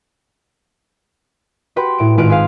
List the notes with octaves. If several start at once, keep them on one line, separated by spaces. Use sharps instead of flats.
F#4 G4 B4 G5 B5 C6
A2 D7
G#1 G#2 F4 B4 F#6 D7
G#4 B4 F5